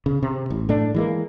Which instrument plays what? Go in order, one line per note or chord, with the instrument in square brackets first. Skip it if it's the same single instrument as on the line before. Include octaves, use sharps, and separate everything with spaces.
[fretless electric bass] C#3
C3
A1
A2 A3 D4
E3 G#3 A#3